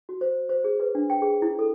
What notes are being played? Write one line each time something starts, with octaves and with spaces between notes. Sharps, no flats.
F#4
C5
C5
G#4
B4
D4
G5
G#4
E4
A4